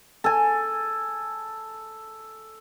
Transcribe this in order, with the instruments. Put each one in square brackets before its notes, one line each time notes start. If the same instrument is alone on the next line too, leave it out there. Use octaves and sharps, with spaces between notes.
[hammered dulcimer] A4 G#5